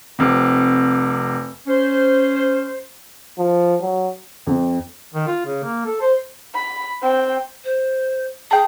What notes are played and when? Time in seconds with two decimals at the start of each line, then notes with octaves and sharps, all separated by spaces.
0.19 F1 C3
1.67 C#4 C5
3.38 F3
3.81 F#3
4.47 F2
5.14 D#3
5.27 F4
5.46 C#3
5.63 A#3
5.86 A4
6.01 C5
6.54 B5
7.02 C4 G5
7.64 C5
8.51 G#4 G5 A5